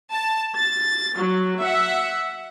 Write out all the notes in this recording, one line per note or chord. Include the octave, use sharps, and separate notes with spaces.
A5
A6
F#3
E5 F#5